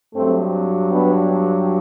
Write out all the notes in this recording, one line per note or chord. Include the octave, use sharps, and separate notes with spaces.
G2 F#3 A3 C4
B3 D4